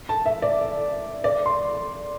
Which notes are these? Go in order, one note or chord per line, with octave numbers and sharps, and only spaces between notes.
A5
E5
D5
D5
C6